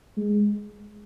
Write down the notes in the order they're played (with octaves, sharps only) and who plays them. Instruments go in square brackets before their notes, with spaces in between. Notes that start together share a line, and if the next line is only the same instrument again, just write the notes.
[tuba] G#3